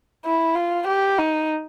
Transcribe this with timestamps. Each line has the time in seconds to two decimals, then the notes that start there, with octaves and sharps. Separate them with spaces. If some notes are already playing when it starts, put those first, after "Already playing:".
0.25 E4
0.55 F4
0.87 G4
1.18 D#4